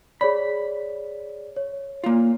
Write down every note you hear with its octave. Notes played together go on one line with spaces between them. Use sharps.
G#4 C#5 D5 B5
C#5
A#3 F4